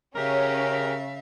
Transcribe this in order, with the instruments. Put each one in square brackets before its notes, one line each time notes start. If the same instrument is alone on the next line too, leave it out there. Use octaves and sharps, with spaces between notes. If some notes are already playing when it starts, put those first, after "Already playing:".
[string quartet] C#3 E5 F5 [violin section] C#4 [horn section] G4 G#4 A#4